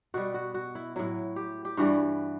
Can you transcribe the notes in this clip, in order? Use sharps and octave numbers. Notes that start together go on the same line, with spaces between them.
B2 G3 F#4
F#4
F#4
E4
A2 F#3 E4
G4
G4
G2 E3 G3 F#4